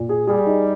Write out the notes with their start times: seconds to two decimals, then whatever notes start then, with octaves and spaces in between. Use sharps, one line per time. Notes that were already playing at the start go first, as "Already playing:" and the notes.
Already playing: A#2
0.09 G#4
0.27 G3 G#4
0.46 D#4